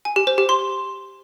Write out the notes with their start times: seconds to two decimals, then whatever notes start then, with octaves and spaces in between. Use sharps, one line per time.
0.05 G#5
0.16 G4
0.27 C5
0.38 G4
0.49 C6